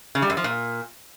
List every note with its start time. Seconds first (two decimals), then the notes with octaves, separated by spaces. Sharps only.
0.15 C#3
0.22 G3
0.30 F#2
0.37 F3
0.44 A#2